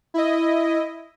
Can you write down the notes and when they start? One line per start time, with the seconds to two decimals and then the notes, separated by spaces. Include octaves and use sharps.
0.14 E4 D#5